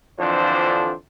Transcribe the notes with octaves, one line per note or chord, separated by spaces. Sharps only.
F2 D3 E3 F3 D4 C5